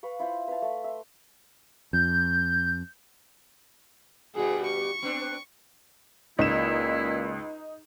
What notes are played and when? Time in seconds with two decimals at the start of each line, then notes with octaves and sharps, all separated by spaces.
0.03 B4 F5 C#6
0.19 E4 F4 C5 B5
0.48 B4 E5 F5 A5
0.62 A3
0.84 E5 C6
1.93 F2 G6
4.35 G2 B2 G3 F#4 G#4
4.66 C#6
5.02 B3 C4 D4
6.39 C#2 A#2 D#4 E4 E7